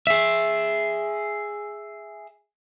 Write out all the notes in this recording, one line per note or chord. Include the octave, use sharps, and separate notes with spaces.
G#4 E5